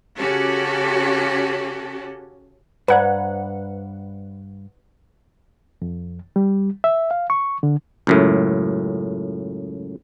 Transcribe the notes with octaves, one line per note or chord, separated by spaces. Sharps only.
C#3 C#4 F#4 G4 A4
G2 B4 C5 D5 F#5 A#5
F2
G3
E5
F5
C#6
D3
C#2 F#2 A2